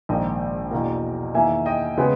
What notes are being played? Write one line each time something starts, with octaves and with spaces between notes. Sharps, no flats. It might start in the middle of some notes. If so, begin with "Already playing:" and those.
A#1 G#2 D#3 A#3 D#5 G5
E2 B2 A#3
E2 D#3 A#3 E5 G#5
D#5 G5
C#3 G#3 B3